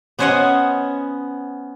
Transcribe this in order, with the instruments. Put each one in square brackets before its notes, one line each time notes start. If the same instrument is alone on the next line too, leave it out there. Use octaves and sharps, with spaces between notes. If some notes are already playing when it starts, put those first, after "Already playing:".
[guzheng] B3 C#4 C5 C#5 D#5 F#5